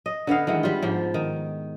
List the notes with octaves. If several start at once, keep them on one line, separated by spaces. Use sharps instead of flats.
D#5
D3 B3 D#5 F5
D#3 E3 G#3 B3
G3 F4
G#2 F3
D#3